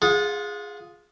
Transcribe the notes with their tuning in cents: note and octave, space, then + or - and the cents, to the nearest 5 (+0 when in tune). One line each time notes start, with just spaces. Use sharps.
F4 +0 G#4 +0 F#5 -35